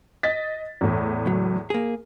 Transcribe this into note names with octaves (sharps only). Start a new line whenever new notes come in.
D#5 A6 B6
E2 A2
C#2 F#3
A#3 G#4